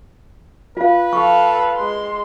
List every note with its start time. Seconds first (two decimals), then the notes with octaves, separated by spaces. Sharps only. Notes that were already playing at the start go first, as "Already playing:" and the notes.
0.77 F4 B4 F5
1.13 A4 F5 C#6
1.77 G#3 C6